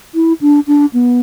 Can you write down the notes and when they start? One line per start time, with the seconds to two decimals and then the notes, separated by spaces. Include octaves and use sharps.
0.15 E4
0.41 D4
0.67 D4
0.93 B3